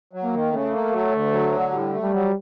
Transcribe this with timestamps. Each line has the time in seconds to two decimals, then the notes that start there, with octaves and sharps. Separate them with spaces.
0.13 F#3
0.23 A#3
0.33 D#3
0.52 C#3 A3
0.72 A#3
0.92 F#3
1.12 D2
1.32 F#3
1.52 D3
1.71 A2 G3
1.92 A3
2.02 G3
2.11 F#3